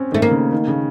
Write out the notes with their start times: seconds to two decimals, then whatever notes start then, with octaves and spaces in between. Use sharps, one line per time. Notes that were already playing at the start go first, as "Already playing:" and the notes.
Already playing: C4 C#4
0.12 D#3 A3
0.22 A#3
0.31 C#3
0.53 D#3
0.68 C#3